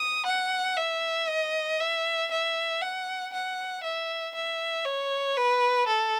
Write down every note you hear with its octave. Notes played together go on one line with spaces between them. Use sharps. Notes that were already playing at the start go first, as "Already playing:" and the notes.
Already playing: D#6
F#5
E5
D#5
E5
E5
F#5
F#5
E5
E5
C#5
B4
A4